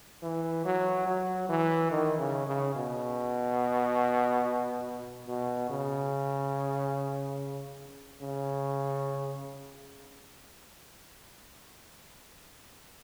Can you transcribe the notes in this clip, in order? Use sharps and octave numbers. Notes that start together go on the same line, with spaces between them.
E3
F#3
F#3
E3
D#3
C#3
C#3
B2
B2
C#3
C#3